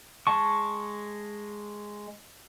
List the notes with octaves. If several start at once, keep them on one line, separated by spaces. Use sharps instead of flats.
G#3 A5 C#6